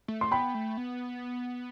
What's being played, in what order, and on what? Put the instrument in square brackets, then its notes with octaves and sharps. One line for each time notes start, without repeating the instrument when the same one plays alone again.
[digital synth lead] A3
[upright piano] C6
[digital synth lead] B3 [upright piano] G5 B5
[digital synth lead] A3
B3